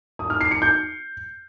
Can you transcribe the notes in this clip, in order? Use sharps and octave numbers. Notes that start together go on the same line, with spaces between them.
D#6
F6
C7
C#7
G6